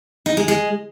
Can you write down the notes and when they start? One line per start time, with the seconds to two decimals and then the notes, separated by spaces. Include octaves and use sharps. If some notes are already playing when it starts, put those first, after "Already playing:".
0.26 D#4
0.37 G#3
0.48 G#3